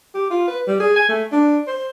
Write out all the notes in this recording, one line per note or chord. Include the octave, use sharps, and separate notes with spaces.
G4
F4
B4
G3
G#4
G#5
A3
D4
C5